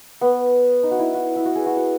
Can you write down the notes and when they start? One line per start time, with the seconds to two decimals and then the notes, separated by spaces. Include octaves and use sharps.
0.21 B3
0.83 D#4
0.91 F#4
0.99 E4
1.14 F#4
1.36 E4
1.45 F#4
1.55 G#4
1.66 F#4
1.77 F#4